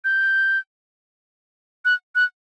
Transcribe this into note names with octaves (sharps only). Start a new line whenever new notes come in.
G6
F#6
F#6